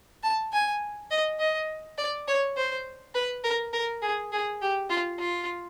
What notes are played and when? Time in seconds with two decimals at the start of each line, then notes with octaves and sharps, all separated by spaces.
0.23 A5
0.52 G#5
1.11 D#5
1.39 D#5
1.98 D5
2.28 C#5
2.56 C5
3.14 B4
3.44 A#4
3.73 A#4
4.02 G#4
4.32 G#4
4.61 G4
4.90 F4
5.19 F4